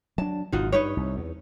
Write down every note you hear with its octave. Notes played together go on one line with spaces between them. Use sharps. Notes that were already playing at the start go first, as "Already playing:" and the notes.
F#3 D4 A5
G#1 B2 D#4 F4 F#4
G2 D#4 B4 C#5
C2
E2